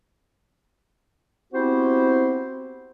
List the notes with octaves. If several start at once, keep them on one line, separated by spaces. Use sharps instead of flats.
B3 C4 E4 F#4 G4 C5